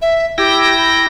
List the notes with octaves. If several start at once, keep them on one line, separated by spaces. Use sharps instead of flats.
E5
E4 G4 G5 A#6
B5